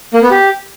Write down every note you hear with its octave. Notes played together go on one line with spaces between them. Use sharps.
A#3
B3
G4